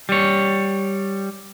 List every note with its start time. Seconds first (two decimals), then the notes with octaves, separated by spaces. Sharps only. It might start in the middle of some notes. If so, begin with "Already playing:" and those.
0.09 G3 C#5